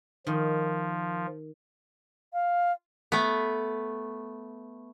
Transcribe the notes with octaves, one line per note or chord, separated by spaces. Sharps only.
D#3 F3
F5
A3 B3